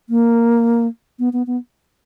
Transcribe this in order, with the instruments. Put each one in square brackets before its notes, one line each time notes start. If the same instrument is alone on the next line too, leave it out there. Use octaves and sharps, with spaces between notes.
[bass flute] A#3
B3
B3
B3